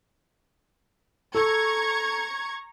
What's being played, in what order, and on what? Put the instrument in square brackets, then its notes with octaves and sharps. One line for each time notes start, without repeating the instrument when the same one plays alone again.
[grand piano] A4 [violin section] A#5 C#6 G#6